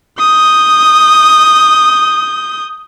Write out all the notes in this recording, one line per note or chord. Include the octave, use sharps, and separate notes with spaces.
D#6 G6